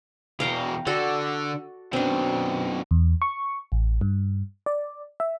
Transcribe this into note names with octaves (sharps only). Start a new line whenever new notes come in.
E2 B2 F5 G5 A#5
D3 F#4 A4 D5
F#2 B2 C4 D4
E2
C#6
A1
G2
D5
E5